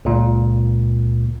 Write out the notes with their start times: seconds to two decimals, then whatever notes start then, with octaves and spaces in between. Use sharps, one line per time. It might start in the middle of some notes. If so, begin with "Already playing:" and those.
0.05 C#2 A#2